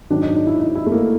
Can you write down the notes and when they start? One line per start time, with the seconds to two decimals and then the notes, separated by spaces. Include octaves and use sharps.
0.10 G#2 D#3 F#3 D4
0.22 D#4
0.34 D#4
0.47 E4
0.60 D#4
0.75 E4
0.86 A3
0.92 A#3